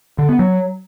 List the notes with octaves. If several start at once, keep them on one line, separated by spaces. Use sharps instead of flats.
D3
B3
F#3